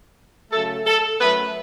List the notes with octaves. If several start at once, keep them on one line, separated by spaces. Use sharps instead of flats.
C#3 F#3 A3 A4
A4
F#2 F#3 A3 B4